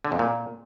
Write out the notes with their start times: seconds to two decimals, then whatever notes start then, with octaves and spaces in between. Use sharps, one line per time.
0.05 D3
0.12 F2
0.19 A#2